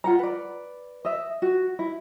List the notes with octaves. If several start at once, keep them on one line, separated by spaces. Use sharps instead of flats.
F4 F#5 A#5
B4 D5
D#5 E5
F#4
E4